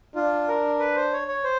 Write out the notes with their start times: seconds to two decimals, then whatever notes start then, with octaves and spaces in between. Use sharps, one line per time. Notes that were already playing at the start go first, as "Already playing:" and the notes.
0.15 D4 F4
0.48 A#4
0.79 B4
0.96 C5
1.13 C#5
1.28 C#5
1.44 C5